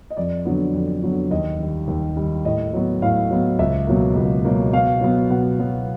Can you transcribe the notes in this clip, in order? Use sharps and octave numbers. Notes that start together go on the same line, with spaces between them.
D#5
F2 D5
D3 F#3 B3
F2
D3 F#3 B3
D#2 D#5
D#3 G3
D#2
D#3 G3
A2 D#5
F#3 B3
A2 F5
F#3 B3
C#2 E5
B2 F#3 A#3
C#2
B2 F#3 A#3
B2 F5
F#3 B3
B2 F#5
F#3 B3